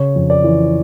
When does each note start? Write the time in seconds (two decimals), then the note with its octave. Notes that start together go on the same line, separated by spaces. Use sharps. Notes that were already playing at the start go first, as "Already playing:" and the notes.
Already playing: C#3 C#5
0.16 F2
0.30 D5
0.44 E3